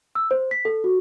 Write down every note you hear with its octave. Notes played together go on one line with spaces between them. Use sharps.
E6
C5
B6
A4
F#4